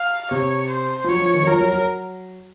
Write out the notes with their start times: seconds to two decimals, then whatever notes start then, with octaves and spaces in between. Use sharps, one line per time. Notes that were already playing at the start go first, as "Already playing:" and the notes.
Already playing: F5
0.31 C3 C#5
0.70 C5
1.04 F3
1.08 F#3 C#5
1.21 F3
1.34 D#3
1.43 F#3
1.47 F3 A#4
1.61 F#3
1.73 F#3